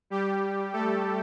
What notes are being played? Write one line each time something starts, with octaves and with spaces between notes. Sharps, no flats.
G3 G4
A3 A4